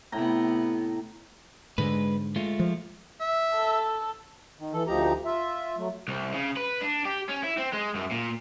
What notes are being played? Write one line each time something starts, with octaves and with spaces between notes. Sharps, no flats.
A2 C3 B3 G5 A#5
G#2 D3 G#3 B4
G#3 A3 F4
F3
E5
A4
D#3
E3 A4
D2 F3 D#4 G4 A#5
F4 E5
F#3 A3
C2
C#3
B4
D4
G4
C#4
E4
C4
G#3
F#2
A#2